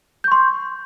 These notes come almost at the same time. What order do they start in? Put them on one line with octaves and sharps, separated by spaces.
G6 C#6 C6